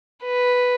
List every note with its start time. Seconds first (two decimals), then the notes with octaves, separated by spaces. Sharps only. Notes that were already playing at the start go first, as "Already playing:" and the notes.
0.24 B4